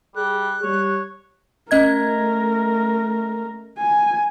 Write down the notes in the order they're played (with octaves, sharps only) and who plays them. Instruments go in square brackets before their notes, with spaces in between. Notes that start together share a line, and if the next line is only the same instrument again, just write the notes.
[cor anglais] G3 [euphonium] G#4 [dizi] F#6
[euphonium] G3 [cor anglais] C#5
[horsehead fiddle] A3 A#4 [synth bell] C#4 D#5 G#6
[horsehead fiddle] G#5